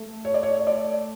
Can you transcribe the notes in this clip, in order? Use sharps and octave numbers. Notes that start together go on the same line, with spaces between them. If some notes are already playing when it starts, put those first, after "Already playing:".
Already playing: A3
C#5
D5
C#5
D5